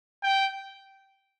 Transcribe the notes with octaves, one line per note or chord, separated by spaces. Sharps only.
G5